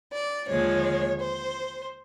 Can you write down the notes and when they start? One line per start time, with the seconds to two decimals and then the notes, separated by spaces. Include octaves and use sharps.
0.13 D5
0.49 D#2 D3 F3 G#3 C#5
1.20 C5